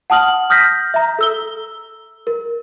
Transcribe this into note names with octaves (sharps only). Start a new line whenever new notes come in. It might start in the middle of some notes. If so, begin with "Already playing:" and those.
F#5 A5 D#6 F6 F#7
D#6 F6 G6 A#6 B6
E5 A#5
A4 E6 G7
A#4